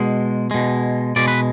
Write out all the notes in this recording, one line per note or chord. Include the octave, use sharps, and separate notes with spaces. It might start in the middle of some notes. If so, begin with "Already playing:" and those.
Already playing: B2 G#3
B2 G#3
B2 G#3 D5
B4